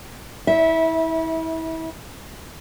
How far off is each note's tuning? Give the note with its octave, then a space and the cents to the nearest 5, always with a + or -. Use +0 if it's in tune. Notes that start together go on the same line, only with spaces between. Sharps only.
E4 -30 E5 -15